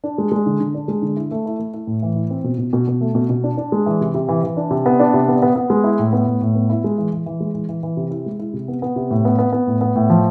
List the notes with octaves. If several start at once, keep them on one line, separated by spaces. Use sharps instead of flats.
D4
G#3
G#3
D3
D3
D4
G#3
D3
E4
A3
E4
A3
E4
A2
E3
E4
C4
B2
B2
B2
B2
A3
B2
B2
D4
D4
G#3
E3
C3
C3
E3
E3
D4
C3
B3
D4
C3
B3
B3
B3
G#3
E4
A2
B3
A2
A2
B3
E4
G#3
E3
E3
E3
G#3
E3
E3
E3
C3
E4
G#3
E4
C3
B3
B3
C3
A2
B3
B3
B3
A2
B3
A2
F3